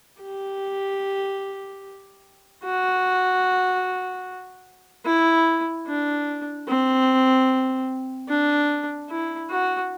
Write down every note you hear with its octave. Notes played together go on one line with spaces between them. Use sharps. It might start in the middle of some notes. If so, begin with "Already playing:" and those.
G4
F#4
E4
D4
C4
D4
E4
F#4